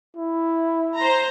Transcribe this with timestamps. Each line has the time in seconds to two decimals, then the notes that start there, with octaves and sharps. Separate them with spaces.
0.16 E4
0.96 C5 A#5